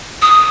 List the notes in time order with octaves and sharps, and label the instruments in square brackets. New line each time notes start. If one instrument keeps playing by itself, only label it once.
[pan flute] D#6